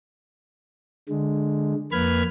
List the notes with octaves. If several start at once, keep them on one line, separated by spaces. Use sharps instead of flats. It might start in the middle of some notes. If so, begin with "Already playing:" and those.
D3 G#3
F2 A#3 B4 B5 F6 G#6